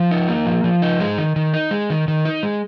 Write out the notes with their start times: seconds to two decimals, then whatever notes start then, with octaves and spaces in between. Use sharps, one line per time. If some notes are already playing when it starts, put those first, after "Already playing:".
Already playing: F3
0.11 D#4
0.29 A#3
0.46 F3
0.64 F3
0.82 D#4
1.00 G#3
1.18 D#3
1.36 D#3
1.54 D#4
1.71 G#3
1.90 D#3
2.08 D#3
2.25 D#4
2.43 G#3